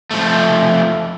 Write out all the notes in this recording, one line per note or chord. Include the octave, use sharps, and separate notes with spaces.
F3 A3